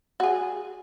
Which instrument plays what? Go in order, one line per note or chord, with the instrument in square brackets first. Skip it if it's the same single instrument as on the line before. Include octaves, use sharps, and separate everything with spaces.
[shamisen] F#4 G#4